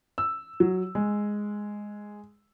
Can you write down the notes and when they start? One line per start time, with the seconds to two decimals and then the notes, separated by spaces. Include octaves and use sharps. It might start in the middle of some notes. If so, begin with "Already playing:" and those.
0.18 E6
0.60 F#3
0.95 G#3